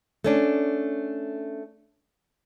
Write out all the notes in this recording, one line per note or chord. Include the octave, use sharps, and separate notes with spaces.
A3 C#4 D4